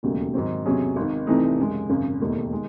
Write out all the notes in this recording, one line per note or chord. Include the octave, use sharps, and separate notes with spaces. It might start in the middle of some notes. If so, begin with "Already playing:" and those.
E1 D#2 C#3 F#3 A3
G#2 D#3 F#3 C4
E2 C3 F#3 C#4 G#4
G#1 G#2 D#3
C2 C3 E3 A3 D#4
F#2 C#3 G#3
G#1 F#2 C#3
E1 D#2 D#3 A3
D#3 G#3